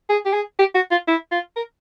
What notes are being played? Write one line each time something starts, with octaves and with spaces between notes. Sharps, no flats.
G#4
G4
G#4
G4
F#4
F4
E4
F4
A#4